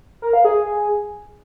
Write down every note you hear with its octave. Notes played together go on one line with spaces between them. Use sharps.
A#4
F5
G#4